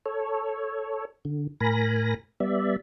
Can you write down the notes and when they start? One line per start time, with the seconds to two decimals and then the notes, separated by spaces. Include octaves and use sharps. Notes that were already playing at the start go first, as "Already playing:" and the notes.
0.06 A4 C#5
1.25 D3
1.60 A2 A#4 G#5 B5 A#6
2.40 G3 B3 D5 E5